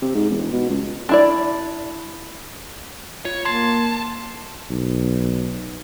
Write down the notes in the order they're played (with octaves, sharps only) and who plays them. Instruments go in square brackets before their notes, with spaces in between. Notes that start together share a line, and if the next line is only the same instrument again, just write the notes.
[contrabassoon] C3
G#2
E1
B2
C#2
[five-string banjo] D4 E4 D5
[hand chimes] F4 [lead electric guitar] C#5
[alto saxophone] A#3 [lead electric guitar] A5 [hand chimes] C6 G#6 C7
[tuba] B1